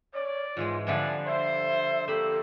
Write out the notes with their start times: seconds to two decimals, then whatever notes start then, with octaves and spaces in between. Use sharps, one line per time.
0.14 C#5 D5
0.57 G#2 E3 G#3 F4
0.87 D3 F3 G3 D5 E5 F#5 G#5
1.27 A4 C5 E5
2.08 A#3 G4 A4 C5 B5